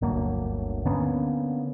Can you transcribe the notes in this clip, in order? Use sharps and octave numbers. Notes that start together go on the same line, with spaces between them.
G1 D2 F#3 A#3
D3 A#3 B3 C#4